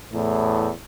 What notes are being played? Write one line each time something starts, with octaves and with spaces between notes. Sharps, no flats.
E2 A2